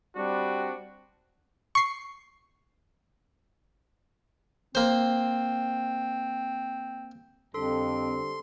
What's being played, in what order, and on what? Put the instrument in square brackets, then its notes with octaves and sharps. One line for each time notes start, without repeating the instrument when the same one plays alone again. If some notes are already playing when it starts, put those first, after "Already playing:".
[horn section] G3 C4 D4 F#4
[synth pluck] C#6 C7
[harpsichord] A#3 C5 [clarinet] C4
[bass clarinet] F2 [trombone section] D3 G3 C4 [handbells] A4 [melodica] C6